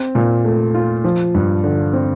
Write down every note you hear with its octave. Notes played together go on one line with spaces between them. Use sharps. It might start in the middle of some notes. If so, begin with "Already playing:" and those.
Already playing: C4
A#2
A3
F4
F3
G2
D3
C4